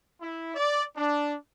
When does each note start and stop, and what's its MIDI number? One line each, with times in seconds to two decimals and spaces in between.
0.21 0.51 64
0.54 0.83 74
0.96 1.34 62